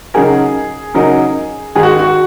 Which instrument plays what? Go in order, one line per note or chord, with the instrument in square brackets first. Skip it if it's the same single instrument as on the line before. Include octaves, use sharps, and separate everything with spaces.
[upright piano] C#3 F#3 D#4 F#4 A#4 [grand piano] G#4
[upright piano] C#3 F#3 D#4 F#4 A#4
[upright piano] G#2 D#3 G#3 D#4 [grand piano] G#4
[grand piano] F#4
F#4